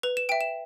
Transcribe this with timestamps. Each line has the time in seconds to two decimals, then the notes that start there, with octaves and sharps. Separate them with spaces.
0.03 B4 F7
0.17 E7
0.29 E5 G5 D7
0.41 E7